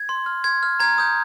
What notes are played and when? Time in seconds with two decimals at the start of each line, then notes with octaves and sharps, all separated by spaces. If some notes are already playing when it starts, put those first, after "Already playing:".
Already playing: G#6
0.09 C6
0.26 F6
0.44 C6 G#6
0.63 F6
0.80 A#5 G#6
0.98 D#6 G6